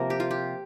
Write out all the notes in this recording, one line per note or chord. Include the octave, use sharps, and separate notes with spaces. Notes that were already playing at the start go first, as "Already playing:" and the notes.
Already playing: C3 F3 A#3 A#4
G4
F4
G4